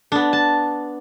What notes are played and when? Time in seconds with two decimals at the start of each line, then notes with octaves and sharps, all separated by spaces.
0.12 B3 D4
0.33 A5